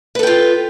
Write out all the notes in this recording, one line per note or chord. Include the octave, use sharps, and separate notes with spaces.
F4 A4 B4 G5